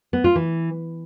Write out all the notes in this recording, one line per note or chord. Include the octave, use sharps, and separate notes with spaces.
B3
F4
E3